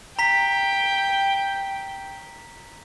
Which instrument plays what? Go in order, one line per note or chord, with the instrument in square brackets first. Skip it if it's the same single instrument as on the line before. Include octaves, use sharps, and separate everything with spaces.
[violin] G5 [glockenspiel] A#5 B6